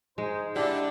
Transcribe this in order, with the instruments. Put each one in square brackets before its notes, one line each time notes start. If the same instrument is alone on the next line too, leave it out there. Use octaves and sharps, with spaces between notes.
[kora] G#3 [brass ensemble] D#4 G#4 C5
[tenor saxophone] D3 [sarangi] D4 [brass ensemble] E4 [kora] G4